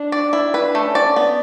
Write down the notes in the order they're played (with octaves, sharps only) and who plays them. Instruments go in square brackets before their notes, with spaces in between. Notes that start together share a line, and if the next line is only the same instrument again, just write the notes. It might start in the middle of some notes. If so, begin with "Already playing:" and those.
Already playing: [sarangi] D4
[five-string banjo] D5
E4
[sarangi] D4 [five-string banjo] B4
[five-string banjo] A3
[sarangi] C#4
[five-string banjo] D5
B3